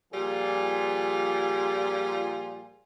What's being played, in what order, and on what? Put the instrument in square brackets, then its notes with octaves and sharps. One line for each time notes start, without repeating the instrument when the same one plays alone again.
[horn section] A#2 F3 G3 F4 G#4